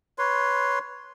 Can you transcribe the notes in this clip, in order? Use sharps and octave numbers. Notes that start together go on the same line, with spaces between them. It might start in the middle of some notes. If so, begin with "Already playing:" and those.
B4 C#5 C6